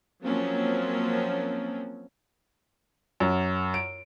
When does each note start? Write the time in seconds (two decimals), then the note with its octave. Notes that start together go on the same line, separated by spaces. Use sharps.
0.24 F3 F#3 A#3 C4 C#4
3.20 F#2
3.74 D7